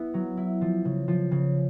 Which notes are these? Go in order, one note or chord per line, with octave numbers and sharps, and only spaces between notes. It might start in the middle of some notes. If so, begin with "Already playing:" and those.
Already playing: B3 E4
F#3
E4
F3
C#3
F3
C#3